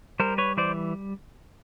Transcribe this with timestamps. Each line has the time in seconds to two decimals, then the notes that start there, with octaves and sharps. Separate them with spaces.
0.20 G3 A#4 C5
0.38 B4 C#5
0.57 E3 C5 D5